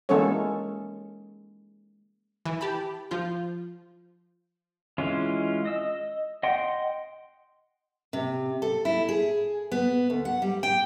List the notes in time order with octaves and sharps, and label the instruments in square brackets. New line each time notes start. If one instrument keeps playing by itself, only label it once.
[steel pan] E3 G#3 A#3 C#4 A4 C#5
[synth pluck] E3
G4 A5 B5
F3 F4 G6
[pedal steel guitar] E3 G#3 C#4 F4
D#5 E6
D#5 F#5 G5 C6
[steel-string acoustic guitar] C3
A4
E4
G#4
B3
D2
F#5
G3
G5